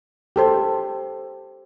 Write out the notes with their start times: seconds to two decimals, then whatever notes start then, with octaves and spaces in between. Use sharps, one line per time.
0.36 G4 A4 C5